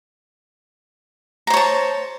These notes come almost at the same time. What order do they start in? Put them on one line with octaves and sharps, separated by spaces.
A#5 C5 C#5 A5